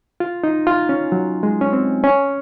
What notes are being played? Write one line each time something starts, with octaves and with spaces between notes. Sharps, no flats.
F4
D#4
F4
C#4
F#3
G#3
C#4
C4
C#4